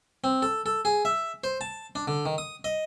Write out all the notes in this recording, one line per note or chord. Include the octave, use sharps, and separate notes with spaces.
C4
A4
A4
G#4
E5
C5
A5
D4
D3
D#3
D#6
D#5